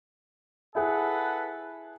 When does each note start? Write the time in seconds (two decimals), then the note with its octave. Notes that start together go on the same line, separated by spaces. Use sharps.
0.75 E4 G#4 A4 B4 F#5